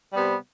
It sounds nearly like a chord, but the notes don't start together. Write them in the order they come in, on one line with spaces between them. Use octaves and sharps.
G3 B3 C3